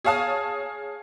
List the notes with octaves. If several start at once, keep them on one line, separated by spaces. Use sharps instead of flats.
G#4 C#5 F5 A5 D#6